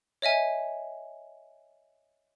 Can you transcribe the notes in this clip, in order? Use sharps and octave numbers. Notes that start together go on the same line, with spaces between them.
C#5 D#5 E5 G#5